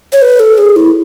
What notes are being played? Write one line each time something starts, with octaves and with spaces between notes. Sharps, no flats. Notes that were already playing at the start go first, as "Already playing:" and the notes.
C#5
B4
A4
G#4
E4